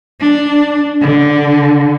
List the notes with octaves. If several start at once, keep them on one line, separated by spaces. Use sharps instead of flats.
D4
D3